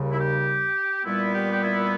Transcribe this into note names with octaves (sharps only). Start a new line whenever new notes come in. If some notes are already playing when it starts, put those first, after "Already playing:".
Already playing: D#2 C#3 G3
E4
G4
A#2 G3 B3 E4
G4
G4
E4